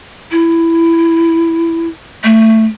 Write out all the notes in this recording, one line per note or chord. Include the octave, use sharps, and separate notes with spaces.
E4
A3